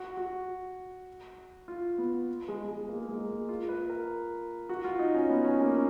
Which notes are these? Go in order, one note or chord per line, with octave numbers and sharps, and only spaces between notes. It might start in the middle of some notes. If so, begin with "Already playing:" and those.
Already playing: F#4
F#4
F4
B3
G#3
G#3
A#3
A#3
G#3
A#3
F4
B4
A#4
F#4
F4
D#4
C#4
B3
C#4
A#3
C#4